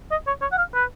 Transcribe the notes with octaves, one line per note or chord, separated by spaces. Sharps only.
D#5
C#5
C#5
F#5
F5
B4